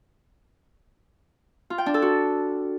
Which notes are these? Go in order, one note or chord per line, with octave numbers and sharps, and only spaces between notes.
F4
G5
D4
A4
F#4